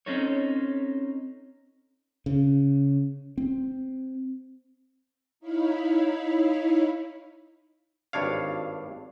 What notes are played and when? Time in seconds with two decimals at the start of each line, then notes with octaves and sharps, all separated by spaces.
0.06 C4 C#4 D#4 A4 C#5
2.26 C#3
3.38 C4
5.40 D#4 E4 C#5 F5 B5
8.13 G#1 G2 D4 C#5 F5